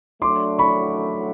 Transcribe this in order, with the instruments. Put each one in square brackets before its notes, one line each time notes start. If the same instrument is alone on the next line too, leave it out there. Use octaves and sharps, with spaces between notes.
[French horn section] F#3 A3 D4 [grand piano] C6 D6
[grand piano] B5 C#6